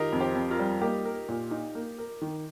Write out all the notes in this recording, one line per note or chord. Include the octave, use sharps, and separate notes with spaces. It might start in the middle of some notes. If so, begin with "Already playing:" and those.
Already playing: D#3 F4 G4 A#4 D#5
F2
G4 C5
F2
F4 A#4
G3
A#3 D#4 G4
A#4
A#2
D#4
A#3
A#4
D#3